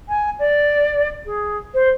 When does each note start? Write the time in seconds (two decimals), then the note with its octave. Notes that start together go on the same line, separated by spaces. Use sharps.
0.08 G#5
0.39 D5
1.25 G#4
1.74 C5